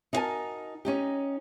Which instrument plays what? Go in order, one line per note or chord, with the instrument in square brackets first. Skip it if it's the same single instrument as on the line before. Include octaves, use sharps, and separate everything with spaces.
[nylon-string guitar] D#4 E4 F#4 A#4 G#5 A5
C#4 D#4 G4